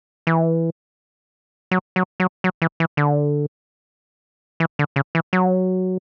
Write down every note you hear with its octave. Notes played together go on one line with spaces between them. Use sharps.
E3
F#3
F#3
F#3
F#3
E3
E3
D3
E3
D3
C#3
E3
F#3